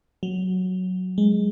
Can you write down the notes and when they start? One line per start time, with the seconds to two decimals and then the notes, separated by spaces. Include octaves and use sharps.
0.23 F#3
1.18 G#3